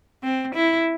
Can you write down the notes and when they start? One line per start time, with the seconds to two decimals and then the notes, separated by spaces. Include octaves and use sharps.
0.23 C4
0.55 E4